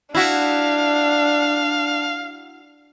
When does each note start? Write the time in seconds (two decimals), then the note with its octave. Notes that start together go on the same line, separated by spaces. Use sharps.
0.15 D4 E4 F#4 F5